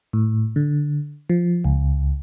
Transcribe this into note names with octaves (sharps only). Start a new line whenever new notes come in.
A2
D3
F3
C#2